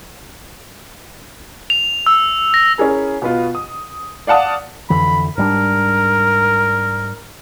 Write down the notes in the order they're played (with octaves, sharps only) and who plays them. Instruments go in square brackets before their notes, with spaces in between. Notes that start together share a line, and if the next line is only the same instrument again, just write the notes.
[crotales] F7
E6
A#6
[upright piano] C#4 E4 G#4 A#4
B2 B3 F4
D#6
D5 F5 F#5 A5 D#6
[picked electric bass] F2 D3 E3 [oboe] B5
[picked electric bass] G#2 G3 D4 [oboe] A#4